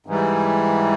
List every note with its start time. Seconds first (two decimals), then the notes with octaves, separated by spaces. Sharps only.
0.06 G#2 E3 G3